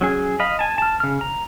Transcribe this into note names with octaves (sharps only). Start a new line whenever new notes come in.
F#3 C#4 G#4
D#5 F5 B5
G#5 A5
A5 F6
C#3 F6
A#5